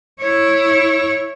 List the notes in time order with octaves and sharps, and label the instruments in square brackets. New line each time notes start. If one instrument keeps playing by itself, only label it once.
[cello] E4 C#5